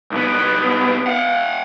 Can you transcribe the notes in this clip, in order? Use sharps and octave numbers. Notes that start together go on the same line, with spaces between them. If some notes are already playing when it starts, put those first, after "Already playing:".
C2 B3
F5 F#5